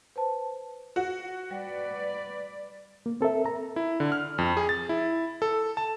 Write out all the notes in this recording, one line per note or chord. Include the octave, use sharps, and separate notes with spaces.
B4 C5 A5
F#4
G3 B4 D5
A#3
C4 A4 A#4 E5
A#5
E4
D3
F6
F2
G#4
A6
E4
A4
A5